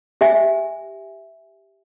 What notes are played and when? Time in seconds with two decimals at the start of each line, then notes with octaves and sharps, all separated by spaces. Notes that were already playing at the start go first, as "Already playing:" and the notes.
0.21 G4 E5 G#5